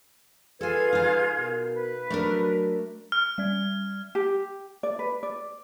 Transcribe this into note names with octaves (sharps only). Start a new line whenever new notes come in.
F4 G#4 A4 B4 G#5 G#6
D#4 F5
B2 A#4
B4
F#3 A3 D4 A#4
F6
G3 D5 G#6
G4
D5
B4
D5